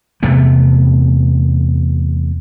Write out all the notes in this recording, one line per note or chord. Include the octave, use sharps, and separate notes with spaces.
E2 C3 A3 B3